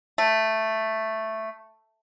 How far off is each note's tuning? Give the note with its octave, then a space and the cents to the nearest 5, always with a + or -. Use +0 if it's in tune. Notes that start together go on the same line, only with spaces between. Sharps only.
A3 +5